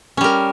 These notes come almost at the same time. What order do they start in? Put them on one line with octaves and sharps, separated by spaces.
C#4 G3 A#4